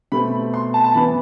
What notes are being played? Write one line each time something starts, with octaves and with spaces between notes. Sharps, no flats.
B2 A3 C4 B5
C6
A5
A5
E3 B3 B5